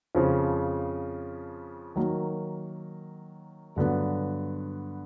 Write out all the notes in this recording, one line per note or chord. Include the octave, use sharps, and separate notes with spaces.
F2 C#3 F3
D#3 F#3 A#3
G2 D3 F#3 B3